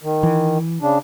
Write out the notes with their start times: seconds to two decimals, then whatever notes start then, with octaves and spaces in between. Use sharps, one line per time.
0.03 D#3
0.23 E3
0.81 C#3 D4